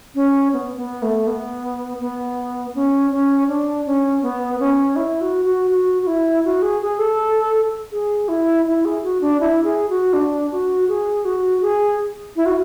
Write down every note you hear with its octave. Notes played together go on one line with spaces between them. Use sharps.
C#4
B3
B3
A3
B3
B3
C#4
C#4
D4
C#4
B3
C#4
E4
F#4
F#4
F#4
F#4
E4
F#4
G#4
G#4
A4
G#4
E4
E4
G#4
F#4
D4
E4
G#4
F#4
D4
F#4
G#4
F#4
G#4
E4
F#4